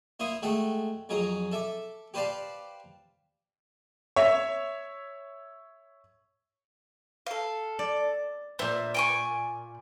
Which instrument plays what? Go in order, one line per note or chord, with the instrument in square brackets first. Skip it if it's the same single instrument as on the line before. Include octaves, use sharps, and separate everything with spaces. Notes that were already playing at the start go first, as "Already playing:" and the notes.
[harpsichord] A#3 E4 C5 D#6
G#3 A3 F#4 A4 G5
F2 F#3 G#4 D#5 A#5
A4 E5 D6
G4 B4 C5 D5 F5 A5
[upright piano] C#5 E5
[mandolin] A4 F5
[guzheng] D5
[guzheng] A#2 E5 [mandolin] C5
[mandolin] G5 G#5 C#6